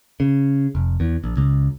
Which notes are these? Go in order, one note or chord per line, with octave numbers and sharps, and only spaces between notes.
C#3
F1
E2
A#1
C#2